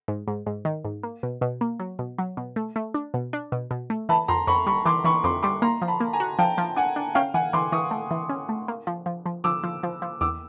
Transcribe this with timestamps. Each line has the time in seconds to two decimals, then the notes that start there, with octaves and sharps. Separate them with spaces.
0.08 G#2
0.28 G#2
0.47 G#2
0.65 D#3
0.85 G#2
1.03 A#3
1.23 B2
1.41 B2
1.61 A#3
1.79 F#3
1.99 B2
2.18 F#3
2.37 B2
2.56 A3
2.76 A3
2.94 D4
3.14 B2
3.33 D4
3.52 B2
3.71 B2
3.90 A3
4.09 E3 A5 B5
4.28 F2 A#5 C6
4.47 F2 B5 C#6
4.67 G3 B5 C#6
4.86 E3 C6 D6
5.04 E3 B5 C#6
5.24 F2 C6 D6
5.43 G3 C6 D6
5.62 A#3 A#5 C6
5.82 F3
5.88 A5 B5
6.00 A#3
6.13 G#5 A#5
6.20 F#4
6.39 F3 G5 A5
6.58 F3
6.76 D4 F#5 G#5
6.96 D4
7.15 C#4 F5 G5
7.34 E3 F#5 G#5
7.53 E3 C6 D6
7.72 E3 C#6 D#6
7.91 A3
8.11 E3
8.29 C#4
8.49 A3
8.68 A#3
8.87 F3
9.06 F3
9.26 F3
9.44 F3 D6 E6
9.63 F3
9.83 F3
10.02 F3
10.21 E2 D6 E6